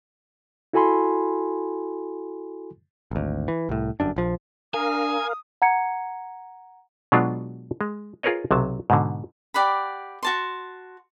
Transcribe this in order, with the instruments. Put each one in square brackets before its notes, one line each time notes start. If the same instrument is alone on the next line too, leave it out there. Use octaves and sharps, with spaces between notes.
[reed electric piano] E4 F#4 A4 G#5 B5 C6
[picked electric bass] G#1 D2
E3
C2 A2
G1 F#2 D4
A#1 F3
[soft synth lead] D4 [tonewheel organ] A#4 F5 [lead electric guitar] G#5 [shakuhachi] D#6
[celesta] F#5 A#5 G#6 C#7
[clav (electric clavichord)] B2 F#3 G#3 B3 D4 F4
G#3
F4 G#4 A#4 B4 C#5 D#5
B1 C3 F#3 A5
G#2 B2 D3
[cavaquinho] G4 D5 F#5 B5
F#4 A5 C6